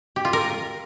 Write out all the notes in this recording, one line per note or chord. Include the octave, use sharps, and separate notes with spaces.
G4
F4
A#4